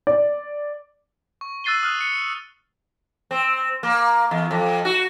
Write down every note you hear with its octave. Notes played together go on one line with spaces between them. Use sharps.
D5
C#6
E6 F#6 A6 C7 D#7 G7
D#6 F6 F#6
C#7
C4
A#3
E2
F2
F#4